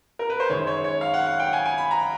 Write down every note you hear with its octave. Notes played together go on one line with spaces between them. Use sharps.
A#4
B4
C5
F#2 D#3 G#3 C#5
C#5
C#5
F5
F#5
F#5
G5
G#5
G#5
B5
A#5